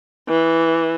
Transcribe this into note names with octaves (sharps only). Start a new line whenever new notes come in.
E3